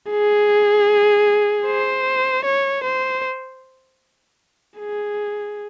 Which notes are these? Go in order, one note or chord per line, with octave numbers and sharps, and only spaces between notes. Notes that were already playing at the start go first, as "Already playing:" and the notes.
G#4
C5
C#5
C5
G#4